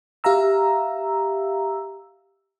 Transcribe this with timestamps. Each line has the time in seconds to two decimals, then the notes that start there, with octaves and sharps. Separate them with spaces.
0.24 G4 E5 F5 A#5 E6